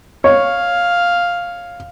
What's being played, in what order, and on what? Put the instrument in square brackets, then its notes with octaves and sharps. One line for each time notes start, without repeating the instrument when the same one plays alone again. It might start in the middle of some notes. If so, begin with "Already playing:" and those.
[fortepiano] C#5 [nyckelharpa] F5